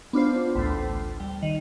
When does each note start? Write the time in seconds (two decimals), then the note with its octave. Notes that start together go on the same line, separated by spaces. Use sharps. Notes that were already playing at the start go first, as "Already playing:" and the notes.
0.13 B3 D4 F4 C5
0.55 A1 D2 A2
1.20 G3
1.42 D#3